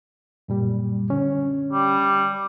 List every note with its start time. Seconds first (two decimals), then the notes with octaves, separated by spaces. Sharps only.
0.48 F#2 A#2 G3
1.10 D3 C#4
1.73 G3